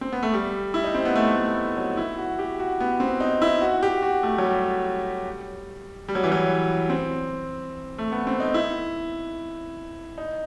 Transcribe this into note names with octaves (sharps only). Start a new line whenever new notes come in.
C4
B3
A3
G3
E4
D#4
C4
B3
A3
A3
F#3
E4
F#4
G4
F#4
B3
C4
D#4
E4
F#4
G4
F#4
A3
F#3
G3
G3
F#3
E3
F#3
C4
A3
B3
C4
D#4
E4
D#4